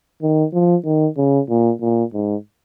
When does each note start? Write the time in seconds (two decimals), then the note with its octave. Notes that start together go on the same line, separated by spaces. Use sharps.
0.23 D#3
0.54 F3
0.85 D#3
1.18 C#3
1.49 A#2
1.82 A#2
2.13 G#2